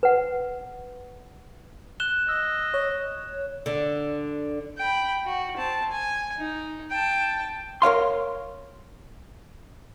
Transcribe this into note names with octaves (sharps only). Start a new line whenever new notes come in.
B4 F#5
F#6 E7 G7
D#5 E6
C#5
D3
G5 B5
F#4
C4 A5
G#5
D#4
G5 A5
A#4 C#5 F5 C6